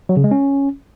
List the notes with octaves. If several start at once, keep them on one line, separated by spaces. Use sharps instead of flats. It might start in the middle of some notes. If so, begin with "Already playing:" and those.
F#3
C#3
G#3
C#4